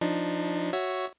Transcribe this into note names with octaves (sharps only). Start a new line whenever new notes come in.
F3 D4 D#4
F#4 C#5 E5